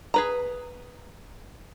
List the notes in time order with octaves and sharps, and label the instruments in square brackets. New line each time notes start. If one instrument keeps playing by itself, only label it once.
[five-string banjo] G#4 B4 A#5